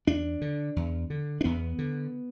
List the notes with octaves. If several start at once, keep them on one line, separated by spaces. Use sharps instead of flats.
E2 D4
D3
E2
D3
D4
E2 B3
D3